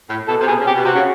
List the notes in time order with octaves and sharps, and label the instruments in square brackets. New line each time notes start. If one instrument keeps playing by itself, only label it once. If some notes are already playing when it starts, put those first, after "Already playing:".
[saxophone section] A2
[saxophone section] B2 [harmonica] A4
[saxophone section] C3
[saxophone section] B2 [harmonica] G#4
[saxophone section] C#3
[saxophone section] C3 [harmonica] G4
[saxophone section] B2
[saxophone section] C3 [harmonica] F#4
[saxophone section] C#3